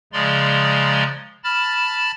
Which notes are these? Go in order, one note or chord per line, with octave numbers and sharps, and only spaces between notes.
C#3 F3 G#3 D5 A#5 C6
A5 B5 F6 A6